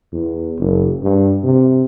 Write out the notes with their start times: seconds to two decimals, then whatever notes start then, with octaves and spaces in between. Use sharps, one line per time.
0.13 E2
0.59 F#1
1.02 G2
1.44 C3